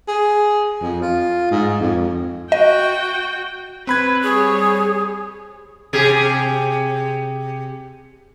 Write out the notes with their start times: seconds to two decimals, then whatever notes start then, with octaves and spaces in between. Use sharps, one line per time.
0.08 G#4
0.81 F2
1.02 F4
1.51 G#2
1.80 F2
2.52 F#4 D#5 G5
3.87 C4 B4 B5 G#6
4.23 G3 G#4 C#5
5.93 C3 G4 G#4